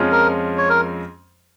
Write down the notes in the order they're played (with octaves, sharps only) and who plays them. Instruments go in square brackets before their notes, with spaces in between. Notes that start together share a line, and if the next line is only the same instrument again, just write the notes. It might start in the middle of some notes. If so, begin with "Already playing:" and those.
Already playing: [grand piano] F2 F3 G#3 C#4 F4
[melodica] A#4
C#5
A#4